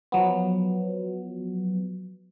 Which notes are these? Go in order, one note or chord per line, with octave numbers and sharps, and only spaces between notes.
F3 F#3 B3